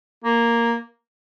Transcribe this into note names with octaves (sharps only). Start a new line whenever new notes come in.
A#3